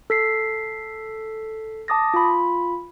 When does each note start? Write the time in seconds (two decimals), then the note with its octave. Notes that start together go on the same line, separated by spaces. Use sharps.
0.10 A4 B6 C7
1.88 A5 D6 D#6 A6 A#6
2.14 F4 B5